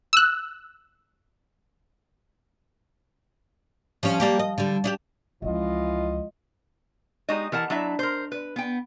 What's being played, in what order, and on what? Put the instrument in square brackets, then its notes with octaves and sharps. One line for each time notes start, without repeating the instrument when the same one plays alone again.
[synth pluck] E6 F#6
[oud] F3 G3 C#4
G3 A#3 G4
D#5
D3 G3
D4 D#4 G4
[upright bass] C#2 F3 [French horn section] E3 F4 D#5
[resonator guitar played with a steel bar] G#3 D#4 F#4 G4 D#5
E3 A#4 F#5 A5
F#3 D4 E4 E5
A#4 C5
B4
B3 G5